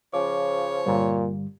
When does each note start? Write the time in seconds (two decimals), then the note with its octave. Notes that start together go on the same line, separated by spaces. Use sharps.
0.14 C#3 F3 C#5 D6
0.86 G2 A#2 D3 G3